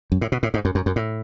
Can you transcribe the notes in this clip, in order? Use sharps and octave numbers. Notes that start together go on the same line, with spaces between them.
F#2
A2
B2
A2
G#2
F#2
F#2
F#2
A2